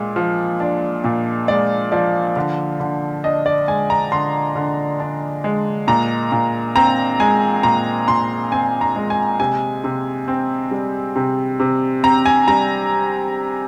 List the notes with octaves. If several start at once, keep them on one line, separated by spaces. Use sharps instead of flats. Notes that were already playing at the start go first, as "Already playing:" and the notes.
Already playing: A#2 G#3
F3
D4
A#2
G#3 D5
F3 D5
D3
D3
D4 D#5
D5
G#3 G#5
A#5
D3 C6
D3
D4
G#3
A#2 A#5
A#2
C4 A#5
G#3 G#5
A#2 A#5
A#2 C6
C4 G#5
A#5
G#3
G#5
C3 G#5
C3
C4
G3
C3
C3
C4 A#5
G#5
G3 A#5